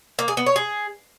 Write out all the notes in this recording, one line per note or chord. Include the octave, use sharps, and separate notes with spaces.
A#3
G#4
B3
C#5
G#4